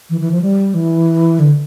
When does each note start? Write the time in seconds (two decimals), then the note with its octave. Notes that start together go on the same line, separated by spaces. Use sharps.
0.10 E3
0.20 E3
0.31 F3
0.42 G3
0.74 E3
1.39 D3